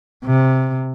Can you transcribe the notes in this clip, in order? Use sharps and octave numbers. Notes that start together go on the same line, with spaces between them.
C3